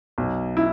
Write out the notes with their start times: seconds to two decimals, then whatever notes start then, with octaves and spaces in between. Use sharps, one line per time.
0.18 B1
0.57 E4